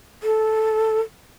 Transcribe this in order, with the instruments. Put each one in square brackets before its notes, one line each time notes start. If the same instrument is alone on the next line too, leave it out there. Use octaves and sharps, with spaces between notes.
[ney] A4